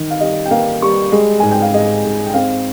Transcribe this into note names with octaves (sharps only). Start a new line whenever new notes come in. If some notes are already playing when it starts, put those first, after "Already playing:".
Already playing: D#3
F5
G3 D#5
G5
A#3 F5
G3 C#6
G#3
G#2 G#5
G5
F5
G#2 D#5
G#2
G5
C4 F5